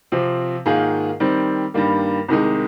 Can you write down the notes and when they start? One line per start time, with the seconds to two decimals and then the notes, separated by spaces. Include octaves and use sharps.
0.12 C3 F3 C4
0.66 G#2 D#3 A#3 F4 G#4
1.20 D#3 G3 C4
1.74 G2 D#3 G3 A#3
2.28 C2 C3 D#3 G#3 D#4